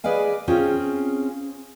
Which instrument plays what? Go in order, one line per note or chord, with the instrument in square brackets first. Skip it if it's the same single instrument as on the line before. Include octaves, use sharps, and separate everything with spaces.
[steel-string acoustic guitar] G#4 B4 D5 D#5 F5 G#5
C4 C#4 F4 G#4